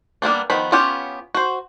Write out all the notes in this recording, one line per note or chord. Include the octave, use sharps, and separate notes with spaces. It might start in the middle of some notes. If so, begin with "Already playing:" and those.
G3 A#3 B3 D4
D#3 F3 B3 B5
B3 C#4 F4 G4 C#5
F#4 C5